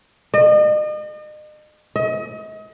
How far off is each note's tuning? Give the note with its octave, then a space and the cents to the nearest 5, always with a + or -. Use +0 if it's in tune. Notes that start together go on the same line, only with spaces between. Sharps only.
D#5 -40
D#5 +35